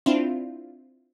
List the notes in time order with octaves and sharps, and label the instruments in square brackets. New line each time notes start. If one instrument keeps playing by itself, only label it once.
[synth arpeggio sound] C4 D4 E4 F4